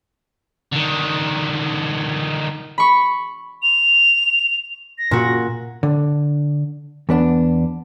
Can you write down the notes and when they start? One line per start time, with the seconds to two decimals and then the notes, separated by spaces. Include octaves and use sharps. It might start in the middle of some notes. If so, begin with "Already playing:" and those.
0.73 D3 D#3
2.78 B5 C#6
3.62 F7
4.98 A#6
5.11 A#2 F#4
5.83 D3
7.09 E2 B3 D4